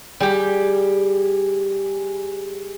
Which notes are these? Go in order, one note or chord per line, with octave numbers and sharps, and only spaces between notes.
G3 G4 G#4